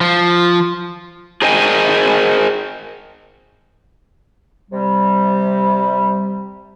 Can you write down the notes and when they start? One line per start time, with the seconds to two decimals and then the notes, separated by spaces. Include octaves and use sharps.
0.01 F3
1.42 G#4 A#4 C5 D#5 G5 G#5
4.71 C3 G3